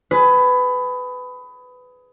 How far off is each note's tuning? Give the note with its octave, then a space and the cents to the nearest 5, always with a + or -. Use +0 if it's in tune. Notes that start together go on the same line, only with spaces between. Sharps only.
G#4 +15 B4 +20